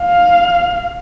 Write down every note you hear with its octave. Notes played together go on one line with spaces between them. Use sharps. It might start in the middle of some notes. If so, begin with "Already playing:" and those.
Already playing: F5